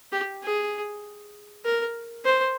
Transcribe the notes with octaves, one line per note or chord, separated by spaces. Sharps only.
G4
G#4
A#4
C5